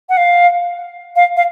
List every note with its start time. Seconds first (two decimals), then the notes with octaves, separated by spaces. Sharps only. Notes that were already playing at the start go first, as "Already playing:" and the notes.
0.09 F#5
0.17 F5
1.16 F5
1.37 F5